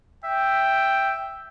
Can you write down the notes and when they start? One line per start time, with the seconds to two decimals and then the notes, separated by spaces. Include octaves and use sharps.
0.24 E5 G5